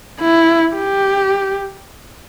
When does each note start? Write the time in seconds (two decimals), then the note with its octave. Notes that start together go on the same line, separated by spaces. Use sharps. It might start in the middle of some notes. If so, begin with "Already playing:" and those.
0.20 E4
0.76 G4